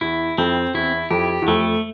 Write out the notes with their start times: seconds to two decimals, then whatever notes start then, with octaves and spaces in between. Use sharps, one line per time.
0.01 E2 E4
0.38 F2 C4
0.74 E2 E4
1.11 F2 G4
1.42 E2
1.47 F2 A3